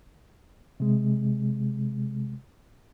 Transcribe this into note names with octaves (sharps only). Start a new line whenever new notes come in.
C3 G#3